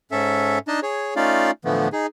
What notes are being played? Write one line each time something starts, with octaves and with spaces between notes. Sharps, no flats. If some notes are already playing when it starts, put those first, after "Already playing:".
G#2 C#4 A4 E5
D4 D#4 D#5 A5
G#4 C#5
A3 C#4 D#4 F4 D5 F5
A2 D3 E3 F3 A3 B3
D#4 G#4